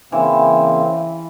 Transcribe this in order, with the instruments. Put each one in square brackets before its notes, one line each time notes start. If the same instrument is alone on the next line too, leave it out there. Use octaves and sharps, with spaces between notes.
[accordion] C#3 A#3 C4 [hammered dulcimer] E3